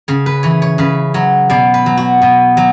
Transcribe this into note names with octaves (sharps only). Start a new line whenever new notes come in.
C#3 C#5
B4
E3 C#5
C#5
C#3 B4
F#3 C#5
B2 D5
B4
F#3
F#4
B2
F#3